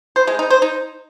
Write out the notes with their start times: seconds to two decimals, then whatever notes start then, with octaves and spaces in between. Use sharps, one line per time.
0.16 C5
0.27 G#3
0.39 D#4
0.50 C5
0.62 D#4